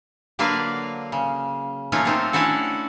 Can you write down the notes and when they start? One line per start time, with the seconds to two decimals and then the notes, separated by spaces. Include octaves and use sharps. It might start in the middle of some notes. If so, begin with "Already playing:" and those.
0.39 D3 F#3 A#3 D4 B4 F5
1.12 C#3
1.92 F#3 A3 A#3 C#4 D#4 F4
2.05 A3 C4 D#4
2.33 C#4 D4 E4 F#4 A4